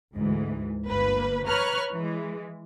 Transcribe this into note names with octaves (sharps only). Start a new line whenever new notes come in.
D2 G#2 E3
G1 A#3 B4
B4 C#5 A#5 C#6 F6 F#6
E3 G#3